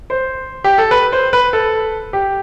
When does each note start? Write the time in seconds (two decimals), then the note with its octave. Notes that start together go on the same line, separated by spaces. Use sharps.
0.10 C5
0.64 G4
0.78 A4
0.91 B4
1.12 C5
1.33 B4
1.53 A4
2.13 G4